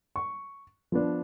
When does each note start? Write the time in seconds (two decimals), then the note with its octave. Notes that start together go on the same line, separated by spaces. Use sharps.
0.16 C#6
0.92 F3 B3 D4